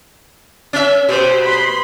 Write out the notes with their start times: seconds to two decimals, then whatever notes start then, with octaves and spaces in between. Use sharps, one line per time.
0.73 C#4 E5
1.09 B2 G4 C5
1.44 B5 C6